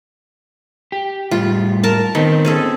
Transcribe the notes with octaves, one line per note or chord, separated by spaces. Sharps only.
G4
A2 G3 F4
A#4 A5
D#3 B3 C4
C#4 G#4 A4